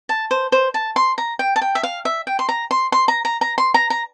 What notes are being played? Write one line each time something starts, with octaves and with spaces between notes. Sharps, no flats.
A5
C5
C5
A5
C6
A#5
G5
A5
G5
E5
F5
E5
G5
C6
A#5
C6
C6
A#5
A#5
A#5
C6
A#5
A#5